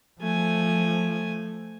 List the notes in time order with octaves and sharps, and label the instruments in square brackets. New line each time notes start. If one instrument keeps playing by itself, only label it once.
[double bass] F3 [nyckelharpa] A3 G#5